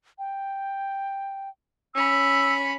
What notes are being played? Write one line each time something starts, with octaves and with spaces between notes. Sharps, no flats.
G5
C#4 B5 E6